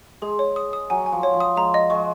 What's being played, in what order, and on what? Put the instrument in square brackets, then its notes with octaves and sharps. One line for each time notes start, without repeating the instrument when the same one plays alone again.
[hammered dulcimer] G#3 [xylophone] G#4
[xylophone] C#5
D#6
D#6
[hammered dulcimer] F#3 [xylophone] G#5
[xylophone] G#5
[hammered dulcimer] F3
[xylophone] C#5
[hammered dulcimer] F3
[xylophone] D#6
[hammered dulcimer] G#3 [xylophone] A#5
[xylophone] D#5
[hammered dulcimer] G#3 [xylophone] C#6